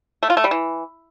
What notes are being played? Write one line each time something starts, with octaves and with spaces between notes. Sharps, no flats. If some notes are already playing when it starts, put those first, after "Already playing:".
A3
F4
A3
G3
E3